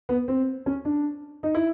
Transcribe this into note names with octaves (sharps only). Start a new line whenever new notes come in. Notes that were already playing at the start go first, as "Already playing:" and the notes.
B3
C4
C#4
D4
D#4
E4